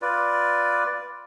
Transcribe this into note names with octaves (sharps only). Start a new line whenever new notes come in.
F4 B4 D5